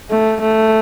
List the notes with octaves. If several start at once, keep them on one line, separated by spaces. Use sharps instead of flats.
A3
A3